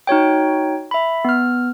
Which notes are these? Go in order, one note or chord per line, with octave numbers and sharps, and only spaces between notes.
D#4 F#4 C#5 G5
E5 B5
B3 F6